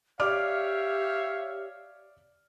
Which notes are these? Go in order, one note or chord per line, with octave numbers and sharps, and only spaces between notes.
G4 C#5 D5 E5 F5 D6 F6